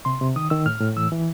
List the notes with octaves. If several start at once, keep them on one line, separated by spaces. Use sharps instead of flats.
C3 C6
C3
D#3 D#6
D#3 E6
A2 F6
A2
E3 E6
E3